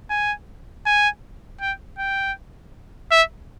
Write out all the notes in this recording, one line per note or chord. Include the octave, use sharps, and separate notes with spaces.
G#5
G#5
G5
G5
E5